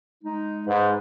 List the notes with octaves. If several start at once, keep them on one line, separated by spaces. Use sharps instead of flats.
G#3 D#4
G#2 B4